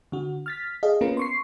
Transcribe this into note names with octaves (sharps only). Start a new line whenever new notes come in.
D3 F#4
F6 A6 B6
G#4 A4 D#5 F5
A#3 B3 C#4 F4 A#4 B4
C6 C#6 C7